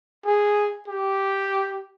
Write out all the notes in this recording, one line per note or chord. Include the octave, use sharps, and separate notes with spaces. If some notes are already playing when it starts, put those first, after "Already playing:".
G#4
G4